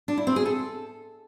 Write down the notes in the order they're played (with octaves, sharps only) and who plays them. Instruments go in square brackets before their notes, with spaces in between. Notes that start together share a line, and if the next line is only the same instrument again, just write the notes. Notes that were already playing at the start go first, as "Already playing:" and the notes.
[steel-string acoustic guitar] D4
E4
C4
G#4
A4